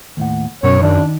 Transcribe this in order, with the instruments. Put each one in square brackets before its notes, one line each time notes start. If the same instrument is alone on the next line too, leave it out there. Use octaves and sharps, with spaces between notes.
[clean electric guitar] D#2 A2 F#5
[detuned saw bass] F#2 [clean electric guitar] B2 C#4 [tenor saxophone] C#5
[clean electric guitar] D#3 [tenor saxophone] D4